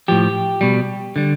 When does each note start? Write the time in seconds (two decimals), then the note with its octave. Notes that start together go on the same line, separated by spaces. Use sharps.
0.08 A2 F3 G4
0.61 B2 G3
1.16 D3 G3